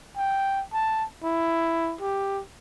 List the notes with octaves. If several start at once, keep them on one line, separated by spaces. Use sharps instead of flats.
G5
A5
E4
G4